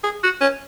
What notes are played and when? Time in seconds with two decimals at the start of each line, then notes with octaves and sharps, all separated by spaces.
0.04 G#4
0.23 F#4
0.41 C#4